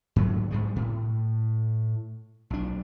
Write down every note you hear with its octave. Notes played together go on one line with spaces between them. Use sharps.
G#2 D3 F#3
G#2 G3 G#3
A2
B1 D4